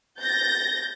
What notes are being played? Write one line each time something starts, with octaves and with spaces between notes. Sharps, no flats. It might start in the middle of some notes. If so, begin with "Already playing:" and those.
G6 A6 A#6